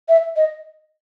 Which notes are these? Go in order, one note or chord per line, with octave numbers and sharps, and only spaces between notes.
E5
D#5